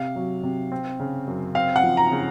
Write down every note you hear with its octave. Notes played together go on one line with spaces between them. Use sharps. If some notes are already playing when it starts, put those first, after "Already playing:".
Already playing: C3 F5
F#3
C3
C4
C#3
F#2
C4 F5
F#5
F3
A#5
C#3